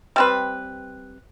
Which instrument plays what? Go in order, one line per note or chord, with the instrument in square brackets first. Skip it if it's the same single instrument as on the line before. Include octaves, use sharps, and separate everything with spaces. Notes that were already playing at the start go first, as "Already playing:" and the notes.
[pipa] G3 C4 B4